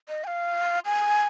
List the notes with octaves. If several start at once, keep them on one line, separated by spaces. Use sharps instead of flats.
D#5
G#5
F5
G#5